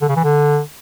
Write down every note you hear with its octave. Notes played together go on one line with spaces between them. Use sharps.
D3
C#3
E3
D3